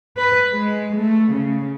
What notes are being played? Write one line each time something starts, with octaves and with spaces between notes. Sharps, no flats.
B4
G#3
A3
C#3